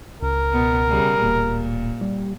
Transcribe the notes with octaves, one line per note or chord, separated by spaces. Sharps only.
C#2 A#4
B2 B3
C#3 G3 G#4
D1 A#2
G3